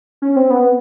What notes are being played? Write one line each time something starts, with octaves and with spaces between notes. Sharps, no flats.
C#4
C4
B3